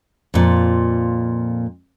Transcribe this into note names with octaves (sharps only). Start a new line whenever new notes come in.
F2 A#2